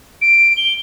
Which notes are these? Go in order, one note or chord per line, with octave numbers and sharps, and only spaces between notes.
D7
G7